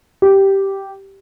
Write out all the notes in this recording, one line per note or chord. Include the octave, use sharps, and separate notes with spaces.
G4